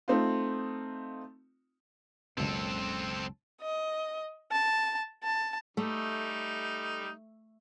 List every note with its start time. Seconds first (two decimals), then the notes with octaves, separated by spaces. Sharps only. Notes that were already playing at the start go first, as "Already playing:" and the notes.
0.08 A3 C4 D#4 F4
2.38 F#1 C#2 B2 C4 A4
3.61 D#5
4.52 A5
5.24 A5
5.77 G3 A3 D#4